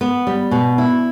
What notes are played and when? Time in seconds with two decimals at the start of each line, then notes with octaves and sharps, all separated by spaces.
0.01 B3
0.27 G3
0.51 B2
0.78 E4